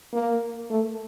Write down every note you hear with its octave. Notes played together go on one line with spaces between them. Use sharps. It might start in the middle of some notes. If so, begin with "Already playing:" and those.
A#3
A3